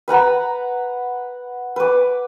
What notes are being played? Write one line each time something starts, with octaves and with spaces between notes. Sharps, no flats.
B4 F#5 A#5 B5
B4 D6